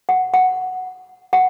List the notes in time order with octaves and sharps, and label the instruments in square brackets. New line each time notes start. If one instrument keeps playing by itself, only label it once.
[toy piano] F#5
F#5
F#5